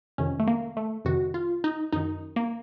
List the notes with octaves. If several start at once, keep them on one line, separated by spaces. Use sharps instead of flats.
F2 C3 D#3 C#4
A3
A#3
A3
F2 C3 D#3 F#4
F4
D#4
F#2 D#3 D#4
A#3